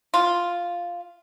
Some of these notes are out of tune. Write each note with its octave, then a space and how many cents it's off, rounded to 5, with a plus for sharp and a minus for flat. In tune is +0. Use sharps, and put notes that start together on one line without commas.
F4 +0